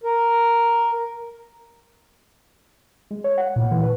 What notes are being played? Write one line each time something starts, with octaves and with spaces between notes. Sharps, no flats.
A#4
G#3
C#5
F#5
A#2
E3
B4